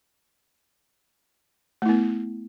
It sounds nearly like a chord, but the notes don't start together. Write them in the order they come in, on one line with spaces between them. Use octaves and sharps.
A3 E4 B3